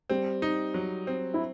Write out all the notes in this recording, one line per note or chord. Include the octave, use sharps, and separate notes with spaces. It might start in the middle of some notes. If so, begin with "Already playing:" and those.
G3 C4
D#4
F#3
C4
E4